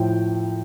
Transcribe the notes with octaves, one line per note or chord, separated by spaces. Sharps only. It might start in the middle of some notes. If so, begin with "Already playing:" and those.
Already playing: A2 F3 G5